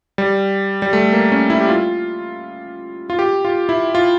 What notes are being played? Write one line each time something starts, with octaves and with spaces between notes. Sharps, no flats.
G3
G3
A3
A#3
C#4
E4
G4
F4
F4
G4
F4
E4
F4